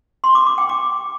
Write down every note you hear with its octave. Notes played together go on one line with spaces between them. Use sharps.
C6
D6
D6
G5
D6